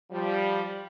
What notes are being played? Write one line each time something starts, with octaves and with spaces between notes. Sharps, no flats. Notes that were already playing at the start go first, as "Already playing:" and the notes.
F3 G3